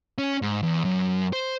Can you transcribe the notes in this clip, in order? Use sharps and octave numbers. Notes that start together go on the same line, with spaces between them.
C#4
G#2
E2
F#2
C5